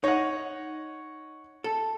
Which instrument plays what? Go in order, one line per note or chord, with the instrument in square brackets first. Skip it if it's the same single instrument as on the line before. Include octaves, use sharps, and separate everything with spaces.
[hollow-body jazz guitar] D#4 [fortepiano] C#5 F#5
[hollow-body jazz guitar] A4